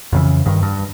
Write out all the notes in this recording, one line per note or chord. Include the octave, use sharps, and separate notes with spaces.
F2 C#3 E3
G2 D#3
G2